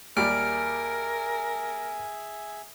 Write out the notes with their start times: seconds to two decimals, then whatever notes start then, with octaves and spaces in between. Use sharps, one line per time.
0.17 D#2 G3 G#4 A#4 E5 G#5 F6 D7